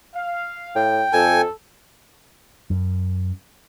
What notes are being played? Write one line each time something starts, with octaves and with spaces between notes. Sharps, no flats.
F5
A2 G5
F2 A4 G#5
F#2